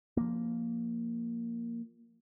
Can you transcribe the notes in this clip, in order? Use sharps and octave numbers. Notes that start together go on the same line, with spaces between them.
F3 A#3